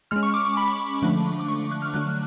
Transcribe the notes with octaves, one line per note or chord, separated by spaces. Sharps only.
G#3 C#4 F6
C#6
D6
C#6
B5
D3 F3 A3 D4
D6
C#6
F#6
F6
D3 F#3 A3 D4 F#6